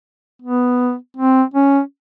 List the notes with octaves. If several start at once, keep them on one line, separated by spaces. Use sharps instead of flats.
B3
C4
C#4